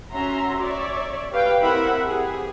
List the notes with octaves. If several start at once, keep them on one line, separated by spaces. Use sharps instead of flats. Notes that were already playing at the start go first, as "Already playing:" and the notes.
C#4 F#4 E5 A#5 C6
C#5 D5 E5
G4 B4 F5 G5
C4 E4 A#4 E5 F#5 B5
G4 G#4